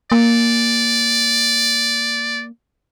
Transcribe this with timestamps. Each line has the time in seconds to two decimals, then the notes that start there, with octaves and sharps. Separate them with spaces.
0.12 A#3 D5